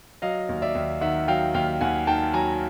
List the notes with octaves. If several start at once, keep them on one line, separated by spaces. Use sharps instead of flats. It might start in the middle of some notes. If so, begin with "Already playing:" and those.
F#3 D#5 F5
D#2
D5 E5
D#2
D#3 E5 F#5
F#3 F5 G5
D#2 F5 G5
D#2 F#5 G#5
D#3 G5 A5
F#3 G#5 A#5